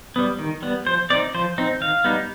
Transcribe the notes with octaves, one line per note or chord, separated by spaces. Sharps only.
G3 B3
D#3
G3 B3
F3 C5
C4 D#4 D5
F3 C5
C4 D#4
D#3 F5
G3 B3 D#4